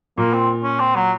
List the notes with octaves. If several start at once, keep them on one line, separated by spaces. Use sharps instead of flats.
A#2 A#3
C4
C#4
C4
F#3